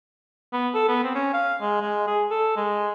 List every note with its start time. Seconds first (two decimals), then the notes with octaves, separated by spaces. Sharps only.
0.53 B3
0.74 A4
0.89 B3
1.04 C4
1.15 C#4
1.33 F5
1.61 G#3
1.81 G#3
2.07 G#4
2.31 A4
2.57 G#3